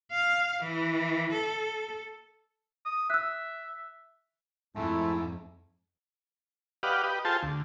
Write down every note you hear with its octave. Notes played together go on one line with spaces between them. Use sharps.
F5
E3
A4
D#6
E5 E6 F#6
F2 G#2 A3 E4
G4 B4 D5 D#5 F5 F#5
G4 B4 D#5
F4 G#4 A4 C5 G5 A5
D2